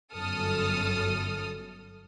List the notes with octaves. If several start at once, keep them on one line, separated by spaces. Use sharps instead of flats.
G1 F#2 A4 D#6 F6